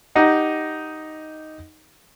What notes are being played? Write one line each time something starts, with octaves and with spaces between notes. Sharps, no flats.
D#4 G4 D#5 F#5